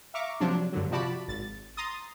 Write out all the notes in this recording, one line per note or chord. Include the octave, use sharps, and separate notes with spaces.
E5 F5 A#5 C#6 D6
C3 F3 F#3 D4
G2 D3 F#3
C3 F3 F#4 D5 A5 B5
G#1 A6
A#5 C6 D#6 A6